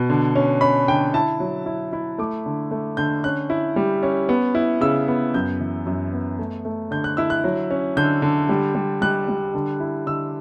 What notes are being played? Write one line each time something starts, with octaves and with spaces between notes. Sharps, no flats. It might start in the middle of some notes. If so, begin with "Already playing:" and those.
Already playing: B2
D3
C#4
C#4 B5
D3 G5
E4 A5
F#3
E4
E4
A3 D6
D3
A3
D3 G6
C#4 F#6
E4
G3
C#4
B3
E4
C#3 E6
B3
F#2 G6
E3
F#2
B3
A3
A3
D3 G6
F#6
E4 E6
F#6
F#3
C#4
D3 G6
D3
G3
G3
G3 F#6
G3
D3
E4
D3 E6